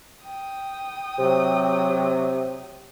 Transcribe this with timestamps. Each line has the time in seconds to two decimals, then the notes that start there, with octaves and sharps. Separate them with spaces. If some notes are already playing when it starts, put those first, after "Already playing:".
0.24 G5 D#6
1.19 C3 F#3